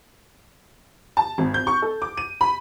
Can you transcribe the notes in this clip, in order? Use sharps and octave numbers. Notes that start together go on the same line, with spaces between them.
A5
G#1
G6
C#6
A4
D6
D#7
B5